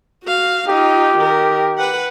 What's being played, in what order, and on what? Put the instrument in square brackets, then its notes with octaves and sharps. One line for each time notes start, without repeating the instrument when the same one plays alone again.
[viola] F#4 F5
[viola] D#4 F4 [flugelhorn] G4
[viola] D#3 A#4
B4 F#5